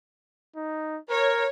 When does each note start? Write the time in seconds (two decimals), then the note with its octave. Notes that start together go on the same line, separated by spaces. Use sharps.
0.56 D#4
1.10 A#4 C#5